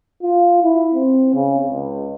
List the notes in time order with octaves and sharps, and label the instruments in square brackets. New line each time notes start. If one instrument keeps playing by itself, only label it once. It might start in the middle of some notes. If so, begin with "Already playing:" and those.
[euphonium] F4
E4
C4
C#3
C#2